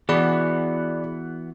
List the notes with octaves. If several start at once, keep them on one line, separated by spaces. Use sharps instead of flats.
E3 B3 F#4 G#4 D5 B5